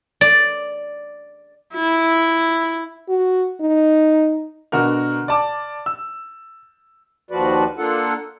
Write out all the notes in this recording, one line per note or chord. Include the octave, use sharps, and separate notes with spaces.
D5
E4
F#4
D#4
B2 D3 F#4 A#4 F6
D5 A5 D6
E6
D#2 F3 F#4 B4 D5
A#3 D4 F4 A4 F#5